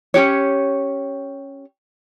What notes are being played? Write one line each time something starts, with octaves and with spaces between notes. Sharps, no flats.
C#4 D#4 G4 C#5